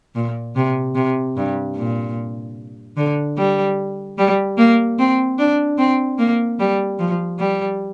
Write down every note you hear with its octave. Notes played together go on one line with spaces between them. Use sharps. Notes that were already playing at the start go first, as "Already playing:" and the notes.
A#2
C3
C3
G2
A#2
D3
G3
G3
A#3
C4
D4
C4
A#3
G3
F3
G3